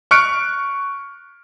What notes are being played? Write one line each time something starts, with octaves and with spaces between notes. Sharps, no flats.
C#6 F6 F#6 C#7 D7